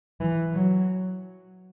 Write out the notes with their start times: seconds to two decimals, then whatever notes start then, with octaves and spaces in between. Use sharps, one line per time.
0.21 E3
0.53 F#3